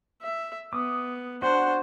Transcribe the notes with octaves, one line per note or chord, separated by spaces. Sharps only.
E5
B3 D6 D#6
D4 F#4 C5 F#5